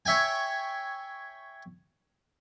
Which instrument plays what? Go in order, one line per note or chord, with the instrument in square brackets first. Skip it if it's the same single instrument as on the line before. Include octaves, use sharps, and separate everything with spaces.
[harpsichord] C#5 E5 G5 G#5